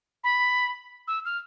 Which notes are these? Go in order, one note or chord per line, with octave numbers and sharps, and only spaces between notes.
B5
E6
F6